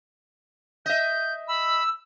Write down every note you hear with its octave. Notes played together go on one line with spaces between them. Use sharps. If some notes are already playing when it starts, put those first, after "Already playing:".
D#5 E5 G6
B5 E6